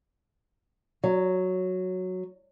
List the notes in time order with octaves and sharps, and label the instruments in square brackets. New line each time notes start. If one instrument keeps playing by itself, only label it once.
[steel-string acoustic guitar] F#3